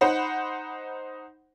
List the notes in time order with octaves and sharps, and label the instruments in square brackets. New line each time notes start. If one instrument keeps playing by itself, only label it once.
[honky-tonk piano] D#4 C5 F#5 B5